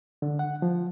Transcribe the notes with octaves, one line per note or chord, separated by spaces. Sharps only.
D3
F#5
F3